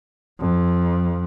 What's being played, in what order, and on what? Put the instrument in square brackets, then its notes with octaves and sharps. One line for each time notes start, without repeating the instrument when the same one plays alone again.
[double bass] F2